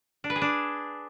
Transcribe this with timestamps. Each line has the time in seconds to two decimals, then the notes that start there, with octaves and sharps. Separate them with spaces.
0.24 D4
0.30 B4
0.36 G#4
0.42 D4